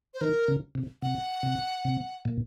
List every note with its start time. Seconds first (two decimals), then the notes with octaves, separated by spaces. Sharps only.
0.14 C5
0.21 D#3 A#4
0.48 C#3
0.75 C3
1.02 C3 F#5
1.43 C3
1.85 C3
2.25 A#2